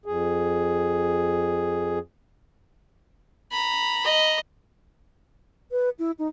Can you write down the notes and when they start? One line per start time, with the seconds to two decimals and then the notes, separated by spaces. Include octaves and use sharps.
0.06 F2 G#4
3.52 A#5 B5
4.04 D#5
5.71 B4
5.99 E4
6.19 D#4